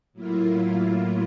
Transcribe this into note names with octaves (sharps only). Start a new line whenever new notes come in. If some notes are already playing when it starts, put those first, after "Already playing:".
A2 F#3 A#3 E4 F4